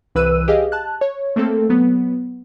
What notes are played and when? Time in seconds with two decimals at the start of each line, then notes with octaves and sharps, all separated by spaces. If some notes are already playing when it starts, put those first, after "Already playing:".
0.15 C2 E3 B4 E6 F#6 D#7
0.48 G4 G#4 D#5 F5
0.72 A5 F#6
1.01 C#5
1.36 A3 A#3 C4 A4
1.69 F#3 B3